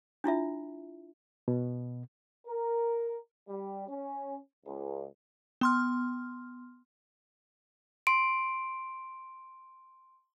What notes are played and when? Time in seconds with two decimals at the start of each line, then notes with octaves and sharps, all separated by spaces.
0.24 D4 E4 F4 E5
1.48 B2
2.46 A#4
3.47 G3
3.87 C#4
4.65 C#2
5.61 B3 C6 F6
8.07 C6 D7